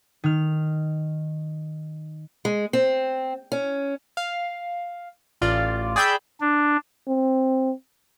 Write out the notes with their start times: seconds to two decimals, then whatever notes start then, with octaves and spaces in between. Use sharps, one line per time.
0.24 D#3 F6
2.45 G#3
2.73 C4
3.52 C#4
4.17 F5
5.41 A1 F4 D5
5.96 G#4 D5 G5 B5 E6 G6
6.41 D4
7.08 C4